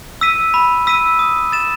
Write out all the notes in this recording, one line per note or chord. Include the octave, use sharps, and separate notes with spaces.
E6 B6 D#7
B5
E6 B6 D#7
D#6
A6 E7